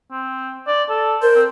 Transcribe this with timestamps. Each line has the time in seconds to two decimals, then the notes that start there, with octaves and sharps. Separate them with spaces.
0.12 C4
0.67 D5
0.89 A4
1.22 A#4 C5
1.35 C4